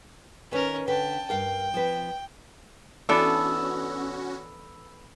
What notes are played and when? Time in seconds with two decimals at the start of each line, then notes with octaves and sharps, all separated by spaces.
0.51 D#3 C#4 A#4 B4
0.88 D3 B4 G5 A5
1.29 G2 A#4 F5 G5
1.74 F3 C4 B4
3.09 E3 B3 C#4 D4 F#4 A4 D5 E6